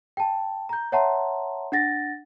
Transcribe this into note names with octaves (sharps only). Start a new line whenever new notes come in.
G5 A5
A#5 G6
C#5 E5 F#5 A5 A#5 C6
D4 F#5 A6 A#6